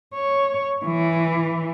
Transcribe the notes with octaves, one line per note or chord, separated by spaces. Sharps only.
C#5
E3